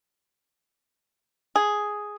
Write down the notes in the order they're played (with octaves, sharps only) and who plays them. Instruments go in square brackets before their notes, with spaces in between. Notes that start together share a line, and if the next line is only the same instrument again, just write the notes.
[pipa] G#4